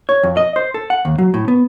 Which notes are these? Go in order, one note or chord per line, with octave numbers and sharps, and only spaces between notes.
C#5
F2
D#5
C5
A4
F#5
D#2
F#3
A2
B3